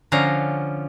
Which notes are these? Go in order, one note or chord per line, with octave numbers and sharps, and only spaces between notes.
D3 F3 C#4 F5 A#5